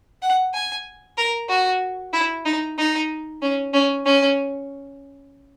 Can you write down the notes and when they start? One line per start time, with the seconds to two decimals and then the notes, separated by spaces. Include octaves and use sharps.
0.22 F#5
0.54 G#5
1.18 A#4
1.49 F#4
2.13 E4
2.45 D#4
2.78 D#4
3.42 C#4
3.74 C#4
4.05 C#4